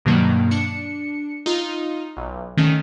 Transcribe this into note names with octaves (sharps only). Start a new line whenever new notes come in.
G2 B2 D#3 F#3 A#3
D4 C#7
D#4 F4
B1
D#3 A3 C#4